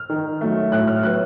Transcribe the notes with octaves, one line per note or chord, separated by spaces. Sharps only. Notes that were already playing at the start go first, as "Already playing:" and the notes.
Already playing: F6
D#3
F#3 A3
A2 F#6
F6
F#3 B3 F#6